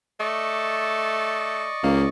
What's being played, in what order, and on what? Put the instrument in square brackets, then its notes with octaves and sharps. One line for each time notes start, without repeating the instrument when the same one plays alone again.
[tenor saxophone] A3 [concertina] D5 D#5 C#6
[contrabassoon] C#2 [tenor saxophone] A#3